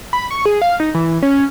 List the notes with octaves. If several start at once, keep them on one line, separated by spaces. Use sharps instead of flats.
B5
C#6
G#4
F5
D#4
E3
C#4